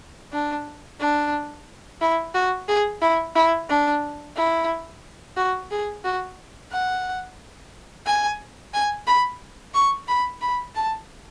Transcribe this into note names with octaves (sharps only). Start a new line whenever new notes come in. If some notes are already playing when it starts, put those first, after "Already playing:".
D4
D4
E4
F#4
G#4
E4
E4
D4
E4
F#4
G#4
F#4
F#5
G#5
G#5
B5
C#6
B5
B5
A5